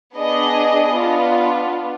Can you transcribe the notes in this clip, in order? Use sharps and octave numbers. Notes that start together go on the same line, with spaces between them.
B3 D4 G#4 D#5
B3 D4 F4